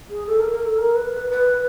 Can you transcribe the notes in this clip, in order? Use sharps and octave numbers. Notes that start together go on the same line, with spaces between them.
G#4
A4
A#4
A#4
A4
A#4
B4
B4
B4